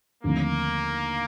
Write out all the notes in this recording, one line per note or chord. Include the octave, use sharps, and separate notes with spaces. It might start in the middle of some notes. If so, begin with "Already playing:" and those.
D#2 D3 F3 A3 A#3 C4